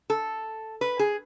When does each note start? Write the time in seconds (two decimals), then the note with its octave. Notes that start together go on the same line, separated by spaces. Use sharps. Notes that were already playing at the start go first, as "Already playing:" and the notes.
0.10 A4
0.81 B4
0.99 G#4